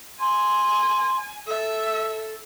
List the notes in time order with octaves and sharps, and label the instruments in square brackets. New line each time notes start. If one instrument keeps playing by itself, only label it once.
[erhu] G#5 [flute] C6
[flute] A4 [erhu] E5